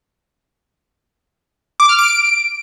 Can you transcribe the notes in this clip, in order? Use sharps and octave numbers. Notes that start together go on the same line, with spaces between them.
D6
F6
D7